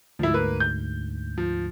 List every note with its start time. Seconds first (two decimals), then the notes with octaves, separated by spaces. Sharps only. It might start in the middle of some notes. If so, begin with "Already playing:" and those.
0.19 D2 G#2 F3 E4
0.34 A#3 B4
0.60 G6
1.38 F3